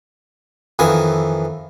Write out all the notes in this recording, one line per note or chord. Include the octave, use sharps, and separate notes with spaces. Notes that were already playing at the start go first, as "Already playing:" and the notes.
F2 D#3 E3 G#5 D#6